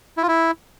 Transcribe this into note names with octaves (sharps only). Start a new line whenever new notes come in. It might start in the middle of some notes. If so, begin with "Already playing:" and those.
E4
F4
E4